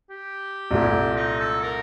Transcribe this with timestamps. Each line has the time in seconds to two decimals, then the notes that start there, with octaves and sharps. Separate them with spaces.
0.10 G4
0.71 C2 A#2 A3
1.16 D#4
1.40 A4
1.63 A#4